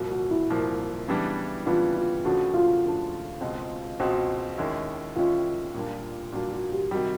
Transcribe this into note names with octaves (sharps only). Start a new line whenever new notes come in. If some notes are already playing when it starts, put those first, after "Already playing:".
Already playing: C2 A#2 F3 A#3 F#4
F#4
E4
C2 A#2 F3 A#3
C#3 E3 G3 B3 D4
C#3 E3 G3 B3 D4 F4
F4
D#2 C#3 F3 A3 D4 F#4
F4
D#2 C#3 F3 A3 D4
C#2 B2 G#3 C4
C#2 B2 G#3 C4 F#4
D#2 D#3 G#3 C#4 E4
D#2 D#3 G#3 C#4 E4 F4
A#2 G3 A#3 D4
A#2 G3 A#3 D4 F#4
F#4
G4
C3 D#3 G3 F#4